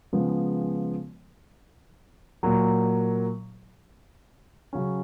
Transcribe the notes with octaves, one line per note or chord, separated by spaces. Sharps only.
C#3 F3 G#3 B3
A#2 F#3 A#3
C#3 F#3 C#4